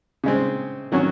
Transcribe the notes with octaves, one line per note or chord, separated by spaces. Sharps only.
C#3 G#3 C4
D#3 F#3 C#4 F#4